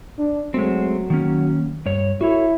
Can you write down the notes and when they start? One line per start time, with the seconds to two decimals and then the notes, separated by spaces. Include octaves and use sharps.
0.18 D4
0.54 F#3 G#3 A3 C4
1.10 D#3 A#3 C#4
1.86 G2 C#5
2.21 E4 F#4 A4 C#5